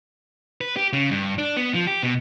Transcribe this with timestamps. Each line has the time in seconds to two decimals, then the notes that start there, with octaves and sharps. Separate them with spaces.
0.61 B4
0.77 G4
0.93 C#3
1.11 G2
1.38 D4
1.57 B3
1.75 F3
1.87 G4
2.03 B2